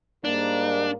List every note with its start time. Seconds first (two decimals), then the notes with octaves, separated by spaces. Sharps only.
0.25 G#2 G3 A#3 D4